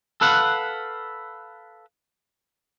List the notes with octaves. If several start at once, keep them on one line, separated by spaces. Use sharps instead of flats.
A4 B4 F5 F#5